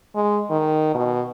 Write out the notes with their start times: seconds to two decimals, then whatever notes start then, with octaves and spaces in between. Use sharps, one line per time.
0.15 G#3
0.50 D#3
0.95 B2